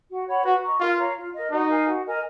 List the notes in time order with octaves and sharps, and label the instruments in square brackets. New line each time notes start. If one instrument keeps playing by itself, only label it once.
[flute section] F#4
C#5 F#5 B5
[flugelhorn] F#4 [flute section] B4
[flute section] D#5 A#5 C#6
[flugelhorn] F4 [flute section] A#4
[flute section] C#5 F5 A#5
F4
A#4 D#5
[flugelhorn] D#4 [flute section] F#4
[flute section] A#4 F5 G#5
F#4
A#4 D#5 G#5